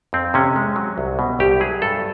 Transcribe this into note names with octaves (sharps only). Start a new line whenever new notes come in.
F2 C4
C3 C#4
G#3
F#3
C2
B2
C2 G4
F#3 G#4
G2 A4